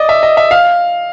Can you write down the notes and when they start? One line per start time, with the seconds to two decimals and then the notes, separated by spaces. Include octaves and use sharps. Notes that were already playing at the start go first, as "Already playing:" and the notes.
Already playing: D5 D#5
0.09 E5
0.23 D#5
0.37 E5
0.51 F5